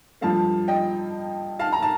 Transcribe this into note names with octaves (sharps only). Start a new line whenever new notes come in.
G2 F3 A3 F5 A5
D#5 G5
F5 A5
A#5
A5